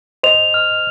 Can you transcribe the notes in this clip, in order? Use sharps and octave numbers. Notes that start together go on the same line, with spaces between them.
C5 D#5 F7
F6